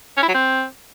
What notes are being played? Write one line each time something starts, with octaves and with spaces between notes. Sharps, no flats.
C#4
E4
F#3
C4